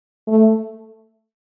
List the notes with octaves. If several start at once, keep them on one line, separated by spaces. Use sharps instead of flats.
A3